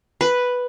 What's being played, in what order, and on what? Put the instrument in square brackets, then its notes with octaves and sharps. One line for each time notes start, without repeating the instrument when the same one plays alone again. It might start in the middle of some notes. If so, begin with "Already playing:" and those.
[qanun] B4